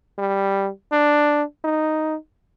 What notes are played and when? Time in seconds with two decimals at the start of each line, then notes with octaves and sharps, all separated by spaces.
0.19 G3
0.92 D4
1.64 D#4